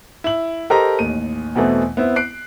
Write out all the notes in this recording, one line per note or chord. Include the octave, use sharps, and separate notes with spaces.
E4 F#7
G4 A4 A#4 C5 D#5 A#5
A1 D#2 D#7
E2 B2 E3 A3 C4
B3 C4 E4
F#6 C7 D7